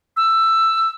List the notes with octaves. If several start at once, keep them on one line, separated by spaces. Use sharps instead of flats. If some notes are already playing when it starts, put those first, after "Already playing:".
E6